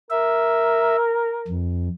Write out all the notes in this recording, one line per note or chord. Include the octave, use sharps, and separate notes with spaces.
A#4 E5
F2